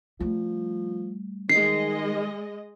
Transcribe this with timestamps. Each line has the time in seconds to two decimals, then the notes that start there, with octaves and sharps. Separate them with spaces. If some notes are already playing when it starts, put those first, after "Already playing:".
0.20 F3 G3 A3
1.49 D#3 G#3 D#5 C7